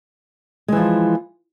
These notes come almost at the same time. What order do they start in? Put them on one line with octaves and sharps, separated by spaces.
G#3 E3 F3